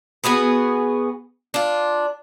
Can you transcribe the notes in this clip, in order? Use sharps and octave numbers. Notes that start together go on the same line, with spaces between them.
B3 F#4 G#4 B4
D4 F4